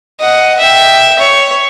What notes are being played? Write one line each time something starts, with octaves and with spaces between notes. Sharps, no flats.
D#5 F#5
E5 G5
C#5